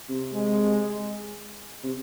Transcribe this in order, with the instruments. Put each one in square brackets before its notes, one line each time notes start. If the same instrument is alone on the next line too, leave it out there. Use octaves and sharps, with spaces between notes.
[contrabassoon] C3
[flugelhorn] G#3
[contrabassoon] C3